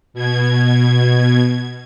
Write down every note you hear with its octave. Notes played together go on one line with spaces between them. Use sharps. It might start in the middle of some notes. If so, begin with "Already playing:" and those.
B2 G#6